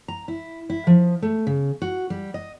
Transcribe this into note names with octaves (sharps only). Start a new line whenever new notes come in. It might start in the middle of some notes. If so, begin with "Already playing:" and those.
A#5
E4
E4
F3
A3
C#3
F#4
G3
D#5